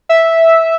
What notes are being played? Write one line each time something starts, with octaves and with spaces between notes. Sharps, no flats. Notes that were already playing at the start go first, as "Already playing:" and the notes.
E5